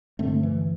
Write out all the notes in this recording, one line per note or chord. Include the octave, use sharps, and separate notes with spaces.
G2 D3 A3 C4
E3